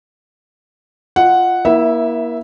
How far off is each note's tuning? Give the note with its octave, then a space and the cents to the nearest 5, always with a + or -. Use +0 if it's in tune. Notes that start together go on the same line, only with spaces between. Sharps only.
F4 +0 D#5 +0 F#5 +0
A#3 +35 E4 -15 E5 +0